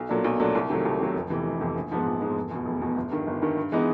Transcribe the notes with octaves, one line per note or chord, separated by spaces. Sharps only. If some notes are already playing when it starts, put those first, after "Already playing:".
Already playing: B1
A#2 F#3 A3 D4
B1
A#2 F#3 A3 D4
C2
C3 D#3 F#3 A3
C2
C3 D#3 F#3 A3
F1
F2 C3 E3
F1
F2 C3 E3
A#1
G#2 F3 G#3 B3
A#1
G#2 F3 G#3 B3
F1
E2 B2
F1
E2 B2
G1
G2 D#3
G1
G2 D#3
G2
E3 G#3 B3 D#4